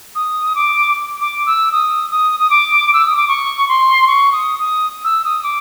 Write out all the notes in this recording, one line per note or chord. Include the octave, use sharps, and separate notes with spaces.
D#6
D6
D6
E6
D#6
D#6
D#6
D6
E6
D#6
D6
C#6
C6
C#6
D#6
D#6
E6
D#6
D6